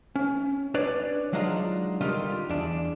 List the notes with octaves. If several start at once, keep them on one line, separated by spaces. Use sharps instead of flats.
C#4
D4 B4 C#5 D5
F#3 G#3 D4 D#4 F4
D3 D#3 G3 D#4 F4
E2 D4